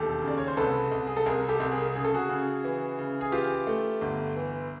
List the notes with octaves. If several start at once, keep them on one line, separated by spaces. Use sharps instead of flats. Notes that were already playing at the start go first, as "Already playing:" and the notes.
Already playing: E1 D#2 G4 A4
C#3
D5
C#5
C5
C2 A4 B4
C2
G#4
A4
C2 G#4 A#4
G4 A4
C2
G#4 A#4
C#3 G#4
A4
F#4 G#4
C#3
E3
C#3
G#4
E3 F4 G4
A3
G1
E3